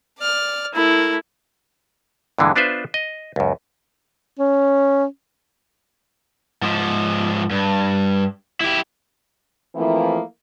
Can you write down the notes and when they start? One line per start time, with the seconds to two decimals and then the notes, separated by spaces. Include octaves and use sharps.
0.18 D5 F6
0.75 A3 E4 A#4
2.39 G2 A#2 D3 E3 G#3
2.56 B3 D4 F4 B4 C5 E5
2.94 D#5
3.36 C#2 F#2
4.39 C#4
6.62 G#2 F3
7.51 G2
8.61 E4 G4
9.75 E3 F3 A3 A#3 C4 E4